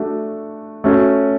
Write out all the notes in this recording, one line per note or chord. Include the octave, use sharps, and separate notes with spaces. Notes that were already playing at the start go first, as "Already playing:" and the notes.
Already playing: A3 D4 F#4
A3 C#4 F#4